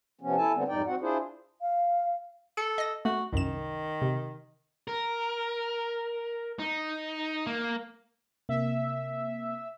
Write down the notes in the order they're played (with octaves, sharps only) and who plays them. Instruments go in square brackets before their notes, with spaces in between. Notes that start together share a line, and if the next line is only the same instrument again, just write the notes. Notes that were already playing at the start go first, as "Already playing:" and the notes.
[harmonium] C3 F3 B3 C#4
E4 A4 G#5 A5
D3 G3 B3 C4
F2 G#2 G3 D#4 D5 G5
C4 F#4 F#5
D4 E4 F4 G#4 C5
[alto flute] F5
[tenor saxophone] A4 [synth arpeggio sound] C#7
[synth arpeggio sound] D#5 A#6
[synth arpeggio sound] A3 [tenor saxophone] F#4
[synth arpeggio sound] C2 F#2 E7 [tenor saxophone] D#3
[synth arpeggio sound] C3
[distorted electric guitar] A#4
D#4
A#3
[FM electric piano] C3 A#3 [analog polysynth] E5